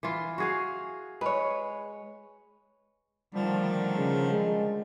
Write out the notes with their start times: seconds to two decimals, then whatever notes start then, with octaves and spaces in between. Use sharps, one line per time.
0.03 E3 F4
0.38 F#4 G#4 F5
1.21 G#3 B4 C#5
3.35 D3 D#3 F3 G3 A3
3.97 C#3
4.31 G#3